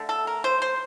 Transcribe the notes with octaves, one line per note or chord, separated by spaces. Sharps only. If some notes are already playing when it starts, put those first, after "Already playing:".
Already playing: D3 A3
A4
A#4
C5
C5